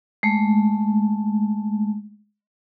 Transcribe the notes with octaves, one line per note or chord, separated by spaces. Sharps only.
G#3 A3